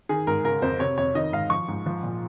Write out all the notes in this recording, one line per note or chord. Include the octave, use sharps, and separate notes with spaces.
D#3 G#4
G#2 A#4
C#3 A#4
F2 C5
C3 C#5
F2 C#5
D#3 D#5
G#2 F5
F3 C#6
G#2
F3
A#2